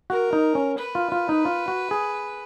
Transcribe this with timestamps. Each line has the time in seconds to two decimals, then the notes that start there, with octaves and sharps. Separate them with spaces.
0.10 F#4 A#4
0.33 D#4
0.55 C#4
0.78 B4
0.95 F4
1.12 F4
1.29 D#4
1.45 F4
1.68 F#4
1.91 G#4